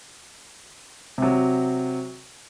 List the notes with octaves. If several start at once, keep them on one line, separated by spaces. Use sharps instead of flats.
C3 F#3